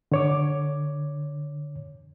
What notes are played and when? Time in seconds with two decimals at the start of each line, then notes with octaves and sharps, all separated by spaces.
0.12 D3 C#5 D6